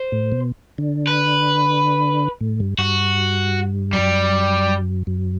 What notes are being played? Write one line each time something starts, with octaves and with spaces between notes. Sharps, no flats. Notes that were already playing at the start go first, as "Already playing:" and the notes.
Already playing: C5
A2
B2
D3
B4
A2
G2
G2 F#4
F#2 G3
F#2